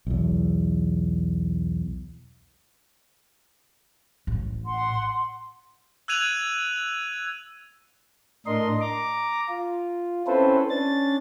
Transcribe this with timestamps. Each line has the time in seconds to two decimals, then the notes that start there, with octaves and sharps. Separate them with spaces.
0.07 B1 E2
4.27 A1
4.66 F#5 C6
6.08 E6 F#6 G#6 D#7 F7 F#7
8.46 A2 D4 A#4 D#5 C6
8.81 A#5 D6
9.49 F4
10.27 C4 C#4 E4 A4 B4 C5
10.70 C#4 D4 A6